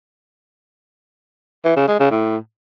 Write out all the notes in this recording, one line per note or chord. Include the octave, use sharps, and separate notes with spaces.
E3
C#3
G#3
C#3
A2